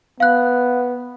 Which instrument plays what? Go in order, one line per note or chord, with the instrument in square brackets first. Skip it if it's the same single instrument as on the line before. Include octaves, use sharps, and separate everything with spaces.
[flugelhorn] B3 [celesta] F5 F#6